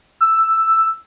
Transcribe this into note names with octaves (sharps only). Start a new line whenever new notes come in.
E6